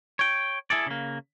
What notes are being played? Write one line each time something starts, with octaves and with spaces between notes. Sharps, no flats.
C#5 G5
E4 G#4 A4 D5
C#3 A#3